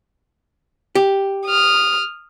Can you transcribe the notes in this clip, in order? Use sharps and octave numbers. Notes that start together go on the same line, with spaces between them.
G4
D#6 F6